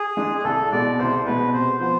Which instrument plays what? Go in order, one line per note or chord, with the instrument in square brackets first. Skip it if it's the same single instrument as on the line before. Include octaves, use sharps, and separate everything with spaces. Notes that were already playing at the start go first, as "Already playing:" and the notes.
Already playing: [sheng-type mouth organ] G#4
[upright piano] G#3 D4
[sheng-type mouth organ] G#4
[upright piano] C2 [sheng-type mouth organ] A4
[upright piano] B2 G#3 [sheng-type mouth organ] D5
[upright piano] C2 [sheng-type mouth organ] C5
[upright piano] B2 G#3 [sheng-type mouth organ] B4
[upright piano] C3 [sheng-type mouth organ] C5
[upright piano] F3 B3 [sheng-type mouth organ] C5